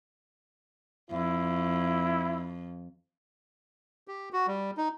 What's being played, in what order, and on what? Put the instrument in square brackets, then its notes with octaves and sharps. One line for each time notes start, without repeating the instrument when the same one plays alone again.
[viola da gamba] F2 [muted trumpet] E4
[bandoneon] G4
F#4
G3
D#4